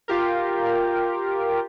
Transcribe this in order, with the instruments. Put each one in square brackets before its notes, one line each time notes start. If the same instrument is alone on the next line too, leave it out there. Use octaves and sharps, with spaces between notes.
[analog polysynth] F4 G4 A#4